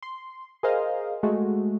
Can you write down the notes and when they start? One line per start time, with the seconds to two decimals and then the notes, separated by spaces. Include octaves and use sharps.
0.03 C6
0.63 G#4 A#4 C5 D#5 F5
1.23 G#3 A3 F#4